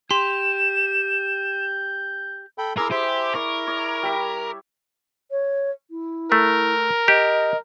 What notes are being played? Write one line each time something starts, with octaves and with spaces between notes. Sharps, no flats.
G4 C6 G6 E7
A4 G5 B5
E4 G#4 A#4 A#5 D6 E6
G4 C5 E5
E4 A#4 D5 C#6
C#5 D5
G3 E5
C#5
E4
A3 A#4
G4 D#5